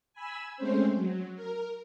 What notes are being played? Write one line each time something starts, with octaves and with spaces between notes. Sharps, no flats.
G#5 B5 E6
G#3 A3 C4 C#4 C5
F#3
A#4